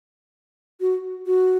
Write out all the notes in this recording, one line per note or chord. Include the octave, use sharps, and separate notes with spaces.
F#4
F#4